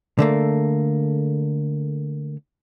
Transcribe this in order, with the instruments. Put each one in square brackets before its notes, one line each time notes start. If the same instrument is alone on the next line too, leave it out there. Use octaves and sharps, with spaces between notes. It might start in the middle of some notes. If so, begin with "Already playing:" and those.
[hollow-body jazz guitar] D3 A3 A#3